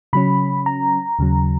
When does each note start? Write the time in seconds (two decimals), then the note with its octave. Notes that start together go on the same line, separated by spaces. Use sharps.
0.13 C#3 F#3 C#4 B5
0.66 A#5
1.19 D#2 C#3 F#3